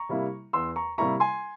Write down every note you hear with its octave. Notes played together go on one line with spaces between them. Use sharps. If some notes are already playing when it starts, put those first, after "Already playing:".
Already playing: A#5 C#6
C3 G3 A#3 E4
E2 C6 E6
A#5 C#6
C3 G3 A#3 E4 A#5 C#6
G#5 C6